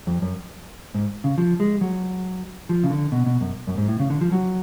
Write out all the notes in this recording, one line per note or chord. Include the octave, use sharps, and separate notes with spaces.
F2
F#2
G#2
C#3
F3
G#3
F#3
F3
C#3
D3
B2
B2
F#2
F#2
G#2
A2
C#3
D3
F3
F#3